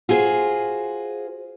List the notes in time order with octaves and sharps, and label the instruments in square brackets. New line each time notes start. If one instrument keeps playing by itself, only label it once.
[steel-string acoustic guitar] F4 F#4 G#4 C5